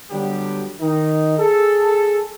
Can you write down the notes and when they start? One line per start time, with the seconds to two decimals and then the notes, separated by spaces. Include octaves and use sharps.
0.10 D3 F#3 G3 B3 G4
0.80 D#3 D#4
1.37 G#4 A4